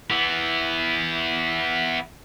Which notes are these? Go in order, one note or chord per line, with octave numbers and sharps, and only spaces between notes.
E3 B3